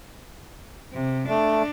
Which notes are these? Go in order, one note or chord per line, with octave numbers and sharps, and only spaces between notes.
C3
A3 D4